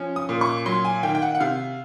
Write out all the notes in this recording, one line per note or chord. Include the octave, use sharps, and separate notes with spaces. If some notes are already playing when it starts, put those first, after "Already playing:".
Already playing: F3 C#4
D#6
A#2
C#6
F#3 C6
G#5
D#3 G5
G5
F#5
F#5
C3 F5